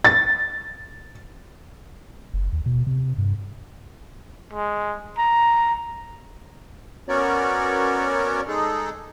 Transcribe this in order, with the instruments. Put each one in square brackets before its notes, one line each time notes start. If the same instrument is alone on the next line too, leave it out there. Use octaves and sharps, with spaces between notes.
[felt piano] A6
[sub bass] F#1
D#2
B2
C3
G2
[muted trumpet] G#3
A#5
[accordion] B3 C#4 F#4 A#4 C#5 D5
G#3 D#4 G#4 A4